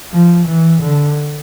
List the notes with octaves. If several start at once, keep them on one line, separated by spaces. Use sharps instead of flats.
F3
E3
D3